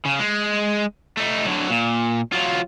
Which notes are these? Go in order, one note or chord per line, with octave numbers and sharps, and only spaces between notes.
C#3
G#3
A3 D#4
D3 F#3
A#2
F#3 F4